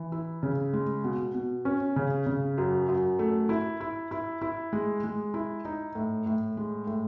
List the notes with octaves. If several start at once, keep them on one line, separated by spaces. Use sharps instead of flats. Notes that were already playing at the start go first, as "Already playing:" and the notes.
Already playing: E3
E4
C#3
G#3
B2
B2
C#4
C#3
C#3
F#2
F#2
A3
E4
E4
E4
E4
G#3
G#3
E4
D#4
A2
A2
G#3
A2